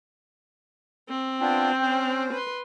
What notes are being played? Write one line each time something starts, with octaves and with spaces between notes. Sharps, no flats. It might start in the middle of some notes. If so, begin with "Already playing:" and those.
C4
B3 D4 F4 G5
C#4 C5
B4 C6